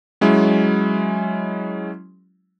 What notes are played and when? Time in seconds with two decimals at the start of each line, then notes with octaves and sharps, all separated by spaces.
0.21 F#3 G#3 C#4 E4